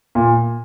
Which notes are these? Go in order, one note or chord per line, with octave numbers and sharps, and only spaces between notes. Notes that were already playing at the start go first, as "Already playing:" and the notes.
A#2